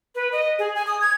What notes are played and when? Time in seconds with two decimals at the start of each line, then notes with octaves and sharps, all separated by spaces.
0.15 B4
0.32 D#5
0.59 G#4
0.75 G#5
0.87 D#6
1.01 G#6